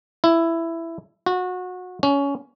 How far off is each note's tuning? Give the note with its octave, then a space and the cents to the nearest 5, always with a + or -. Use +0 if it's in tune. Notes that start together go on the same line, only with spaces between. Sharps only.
E4 +10
F#4 -25
C#4 +20